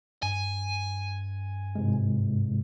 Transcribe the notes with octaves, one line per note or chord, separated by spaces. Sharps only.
G2 G#5
G#2 C3 G#3